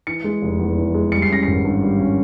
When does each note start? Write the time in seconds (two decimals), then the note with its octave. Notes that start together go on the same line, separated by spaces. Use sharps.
0.07 E3 C#7
0.24 G#3
0.42 F1
0.59 E2
0.77 E3
0.94 G#3
1.12 G3 C#7
1.22 C7
1.30 C#4 A#6
1.43 G#1 C7
1.65 G2
1.82 G3
2.00 C#4